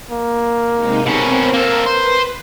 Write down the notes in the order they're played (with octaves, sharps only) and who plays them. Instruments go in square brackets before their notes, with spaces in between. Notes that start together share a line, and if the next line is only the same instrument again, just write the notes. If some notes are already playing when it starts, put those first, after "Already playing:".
[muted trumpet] A#3
[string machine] C3 G#3 D#4
[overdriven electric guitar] B2 C#4 [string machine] C4 [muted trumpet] A#4
[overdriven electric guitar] A#3 A4
[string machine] B4 [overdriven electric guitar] C5